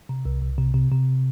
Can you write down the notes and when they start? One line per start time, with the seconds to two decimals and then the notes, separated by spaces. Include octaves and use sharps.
0.09 C3
0.25 C2
0.42 C2
0.58 C3
0.74 C3
0.92 C3